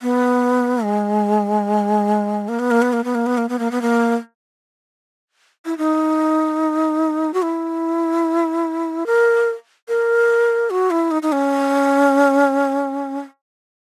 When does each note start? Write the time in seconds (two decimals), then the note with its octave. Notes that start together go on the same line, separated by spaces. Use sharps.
0.02 B3
0.84 G#3
2.48 A#3
2.59 B3
2.71 A#3
2.82 B3
2.93 A#3
3.04 B3
3.15 A#3
3.26 B3
3.37 A#3
3.49 B3
3.59 A#3
3.71 B3
3.82 A#3
5.66 E4
5.78 D#4
7.34 F#4
7.42 E4
9.06 A#4
9.88 A#4
10.70 F#4
10.91 E4
11.11 D#4
11.22 D#4
11.32 C#4